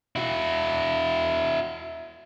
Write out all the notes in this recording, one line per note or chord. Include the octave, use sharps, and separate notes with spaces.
E4 F#4